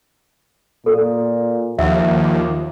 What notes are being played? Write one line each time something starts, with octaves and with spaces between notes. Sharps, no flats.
A#2 A4
D#2 F3 E5 F#5 E6
D6